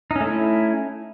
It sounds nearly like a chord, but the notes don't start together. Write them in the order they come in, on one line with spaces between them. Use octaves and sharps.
D#4 C#4 A3 E4